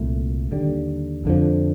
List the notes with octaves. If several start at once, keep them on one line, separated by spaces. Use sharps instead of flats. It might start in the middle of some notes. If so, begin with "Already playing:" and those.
Already playing: C2 A#2 A3
D#2 D3 G3
F2 D3 F3